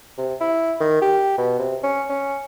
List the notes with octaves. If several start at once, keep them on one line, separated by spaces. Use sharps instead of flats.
C3
E4
D#3
G4
B2
C3
C#4
C#4